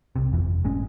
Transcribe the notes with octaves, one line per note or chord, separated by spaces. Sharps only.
C2 C3
G1 F2 E3
G1 A2 G#3 C#4